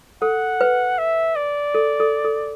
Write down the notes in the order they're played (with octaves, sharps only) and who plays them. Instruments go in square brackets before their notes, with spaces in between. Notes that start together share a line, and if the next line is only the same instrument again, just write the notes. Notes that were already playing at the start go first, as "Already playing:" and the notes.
[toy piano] A4 [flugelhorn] F#5
[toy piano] B4
[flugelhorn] E5
D5
[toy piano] A4
A4
A4